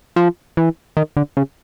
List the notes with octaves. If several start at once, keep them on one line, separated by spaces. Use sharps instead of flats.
F3
E3
D#3
D3
C#3